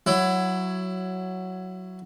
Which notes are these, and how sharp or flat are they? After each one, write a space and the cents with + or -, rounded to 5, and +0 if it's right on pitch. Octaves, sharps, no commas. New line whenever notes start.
F#3 +0 E4 +15